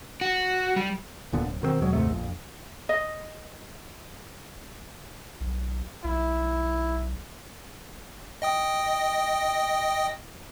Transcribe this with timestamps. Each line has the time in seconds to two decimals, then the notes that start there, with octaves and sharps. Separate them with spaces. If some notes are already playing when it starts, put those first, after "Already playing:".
0.21 F#4
0.76 G3
1.33 D1 A#2 D3 B3
1.46 D1
1.62 B2 D#3 G#3 C4
1.81 E2 B2 F#3 G#3
1.93 D#2 G#2 C3 A3
2.10 A#1 F2
2.89 D#5
5.40 B1
6.04 B1 E4
8.42 D#5 G5 D#6